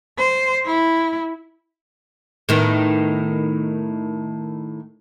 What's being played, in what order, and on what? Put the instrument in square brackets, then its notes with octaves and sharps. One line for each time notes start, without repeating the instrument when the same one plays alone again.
[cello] C5
E4
[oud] A2 D#3 B3